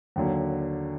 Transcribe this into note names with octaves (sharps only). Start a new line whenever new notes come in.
D#2 D3 F#3